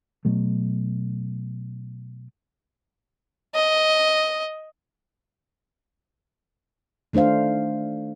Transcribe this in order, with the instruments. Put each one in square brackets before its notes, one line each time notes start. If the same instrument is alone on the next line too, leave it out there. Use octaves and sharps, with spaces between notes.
[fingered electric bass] B2 F#3 A3
[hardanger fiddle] D#5
[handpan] D#3 A3 D4 C5 F5